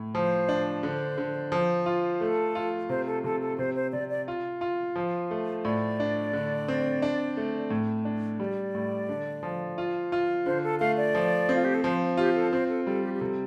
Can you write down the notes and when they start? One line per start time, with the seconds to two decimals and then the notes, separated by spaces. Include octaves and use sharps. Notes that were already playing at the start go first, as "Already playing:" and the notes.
Already playing: A2
0.15 F3 C5
0.49 D4
0.83 D3 C5
1.18 D3
1.52 F3
1.86 F4
2.21 A3 A4
2.55 F4
2.89 C3 C5
3.07 A4
3.24 C3 A4
3.41 A4
3.58 C3 C5
3.75 C5
3.92 C3 D5
4.09 D5
4.28 F4
4.61 F4
4.96 F3
5.31 A3
5.64 A2 D5
6.00 D4
6.33 D3
6.68 C4
7.02 D4
7.37 A3
7.70 A2
8.05 D4
8.40 G3 D5
8.75 A2
9.09 D3
9.43 F3
9.78 F4
10.12 F4
10.46 D3 C5
10.63 A4
10.80 A3 F5
10.97 D5
11.15 F3
11.49 C4
11.56 F4
11.64 G4
11.74 A4
11.83 F3 C5
12.17 F4 G4
12.35 A4
12.52 C4 C5
12.69 A4
12.87 G3 A4
13.03 G4
13.14 G4
13.20 C3 A4